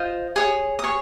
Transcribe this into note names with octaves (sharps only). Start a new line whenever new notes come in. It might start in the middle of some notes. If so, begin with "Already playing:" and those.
Already playing: F4 C5 D#5
G#4 C#5 D#6
D#6
G#4 C#5 C#6